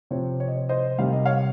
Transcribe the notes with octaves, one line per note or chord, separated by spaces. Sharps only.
C3 F3 C4 C#5
C#5
D#5
C#5
C5 D#5
C3 D#3 G3 F5
D#5
C#5 F5